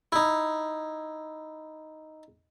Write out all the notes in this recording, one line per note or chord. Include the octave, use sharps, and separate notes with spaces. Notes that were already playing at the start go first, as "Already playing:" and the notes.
D#4 E4